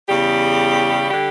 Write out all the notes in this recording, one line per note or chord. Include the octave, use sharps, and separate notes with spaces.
E2 C#3 G3 G4
D3 G3 G4